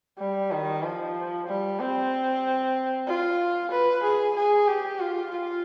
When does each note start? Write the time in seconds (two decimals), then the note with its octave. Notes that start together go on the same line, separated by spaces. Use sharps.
0.19 G3
0.51 D#3
0.83 F3
1.48 G3
1.79 C4
3.07 F4
3.71 B4
4.03 G#4
4.36 G#4
4.68 G4
5.00 F4
5.31 F4